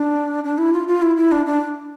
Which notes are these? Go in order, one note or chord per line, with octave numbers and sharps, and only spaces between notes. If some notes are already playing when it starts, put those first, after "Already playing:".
Already playing: D4
D4
E4
F4
F4
E4
E4
D4
D4